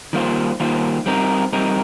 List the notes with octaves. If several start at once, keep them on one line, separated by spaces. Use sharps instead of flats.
D#3 G3 A#3 F4 C5
D#3 G3 A#3 F4 C5
G3 C4 D#4 A#4
G3 C4 D#4 A#4